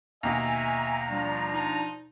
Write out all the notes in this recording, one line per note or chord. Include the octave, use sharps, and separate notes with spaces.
D#2 B2 D#5 E5 G#5 A#5
F3 G3 D4
D#4